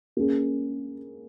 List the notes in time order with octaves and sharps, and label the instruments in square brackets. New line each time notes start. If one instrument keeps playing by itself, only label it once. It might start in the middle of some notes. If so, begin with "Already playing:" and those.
[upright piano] A#3 C#4 G#4